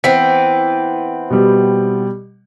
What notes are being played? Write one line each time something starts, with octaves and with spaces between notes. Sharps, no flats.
E3 B3 C4 B6
B2 G3 G4